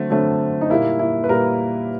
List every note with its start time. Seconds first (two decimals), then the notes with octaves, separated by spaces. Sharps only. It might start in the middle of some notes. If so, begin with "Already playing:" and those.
Already playing: D3 F#3 A3 C4
0.10 D3 F#3 A3 C4
0.61 D#4
0.70 A#2 G3 A#3 E4
0.99 E4
1.24 B4
1.29 A#2 G3 A#3 A#4